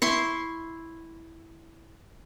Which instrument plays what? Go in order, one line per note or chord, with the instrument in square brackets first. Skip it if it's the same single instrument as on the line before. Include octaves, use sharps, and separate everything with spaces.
[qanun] E4 C6 C#6